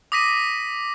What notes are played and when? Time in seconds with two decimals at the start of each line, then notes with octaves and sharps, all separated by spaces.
0.12 D6 D#6 A#6 B6 D#7